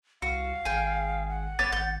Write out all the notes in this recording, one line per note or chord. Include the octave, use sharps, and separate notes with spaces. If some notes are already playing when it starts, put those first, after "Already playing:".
C2 F#4 F5
G#1 G#4 G5
F#5
G1 B3 C#5 D6 A6
G#1 G6